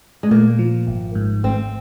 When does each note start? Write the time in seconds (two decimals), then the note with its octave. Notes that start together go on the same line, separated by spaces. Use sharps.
0.23 G#3
0.31 A#2 A#3
0.59 F3
0.87 G#1
1.15 G#2
1.43 G#1 C4